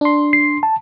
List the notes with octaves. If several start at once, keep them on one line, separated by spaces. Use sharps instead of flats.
D4 C6
C7
A5